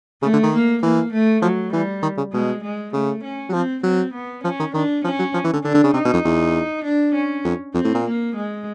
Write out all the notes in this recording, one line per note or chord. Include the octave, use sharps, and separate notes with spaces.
C#3 A3
D3
D#3
A#3
E3 A#3
A3
F3 F#3
E3 G3
D#3
C#3
B2 G#3
G#3
C#3 A3
C#4
F#3
F3 C4
F#3 C4
B3
F3 C#4
D#3
D#3 D4
F3 C#4
F#3
F3
E3
D3
D3 D4
D3
C#3
C3 D#4
B2
F2
E2
D4
C#4
F2
F2 C4
A2
A#2
A#3
G#3